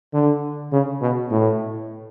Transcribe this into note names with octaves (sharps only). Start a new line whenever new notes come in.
D3
C#3
B2
A2